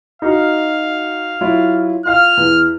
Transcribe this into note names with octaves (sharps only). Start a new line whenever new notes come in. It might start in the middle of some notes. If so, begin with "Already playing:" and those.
D#4 F#4 F5
F#3 E4 F4
F4 F5 F6
E2